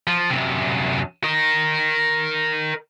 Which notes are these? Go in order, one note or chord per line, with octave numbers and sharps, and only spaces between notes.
F3
F#2 C3
A#4 D#5